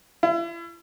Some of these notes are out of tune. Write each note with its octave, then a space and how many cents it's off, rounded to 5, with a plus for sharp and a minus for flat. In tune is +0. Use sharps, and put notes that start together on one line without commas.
E4 +40